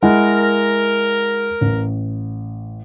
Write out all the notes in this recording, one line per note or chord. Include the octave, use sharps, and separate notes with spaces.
G#3 E4 A#4 F#5
A1